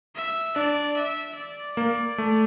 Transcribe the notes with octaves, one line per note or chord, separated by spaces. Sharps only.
E5
D4 D5
E5
D5
A#3
A3